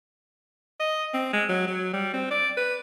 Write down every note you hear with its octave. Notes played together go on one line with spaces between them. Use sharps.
D#5
C4
G#3
F#3
F#3
G3
C4
D5
B4